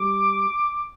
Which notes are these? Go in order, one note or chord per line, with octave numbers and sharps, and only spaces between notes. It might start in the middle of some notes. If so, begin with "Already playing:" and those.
Already playing: G3 D6